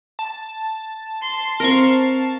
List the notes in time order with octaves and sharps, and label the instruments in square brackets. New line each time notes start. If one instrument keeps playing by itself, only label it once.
[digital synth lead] A5
[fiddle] C6
[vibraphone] C4 C5 [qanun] A#4 C6 C#6 [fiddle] F5